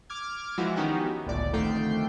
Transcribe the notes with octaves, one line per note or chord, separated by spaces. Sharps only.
D6 F6 G#6
E3 F3 G#3 E4 F#4
D#3 B3 C#4 D#4 F#4 G4
G1 C#2 A2 D5
F2 D3 D#3 A3 G5 C7